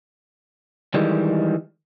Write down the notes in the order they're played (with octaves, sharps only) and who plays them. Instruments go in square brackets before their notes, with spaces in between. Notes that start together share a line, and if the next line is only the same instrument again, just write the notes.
[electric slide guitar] D#3 E3 G3 G#3